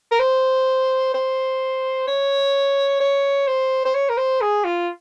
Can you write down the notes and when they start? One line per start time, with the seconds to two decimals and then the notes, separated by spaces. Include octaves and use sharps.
0.12 A#4
0.20 C5
1.14 C5
2.07 C#5
3.00 C#5
3.47 C5
3.85 C5
3.94 C#5
4.09 A#4
4.18 C5
4.41 G#4
4.64 F4